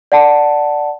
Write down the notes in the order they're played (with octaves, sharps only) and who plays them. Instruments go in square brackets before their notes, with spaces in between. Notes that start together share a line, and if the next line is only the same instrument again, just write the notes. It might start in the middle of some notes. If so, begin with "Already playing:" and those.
[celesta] D5 F#5 A5